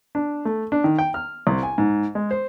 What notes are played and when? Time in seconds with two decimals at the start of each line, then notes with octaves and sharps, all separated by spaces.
0.15 D4
0.45 A3
0.72 D4
0.84 D#3
0.99 G5
1.14 F6
1.47 C2
1.63 G#5
1.78 G#2
2.15 G#3
2.31 C5